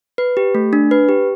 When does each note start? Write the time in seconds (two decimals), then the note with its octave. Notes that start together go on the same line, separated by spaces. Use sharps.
0.18 B4
0.37 G4
0.55 A3
0.73 D4
0.91 B4
1.09 G4